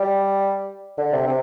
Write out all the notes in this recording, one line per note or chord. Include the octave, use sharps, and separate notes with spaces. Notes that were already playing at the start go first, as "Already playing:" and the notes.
Already playing: G3
D3
C3
C3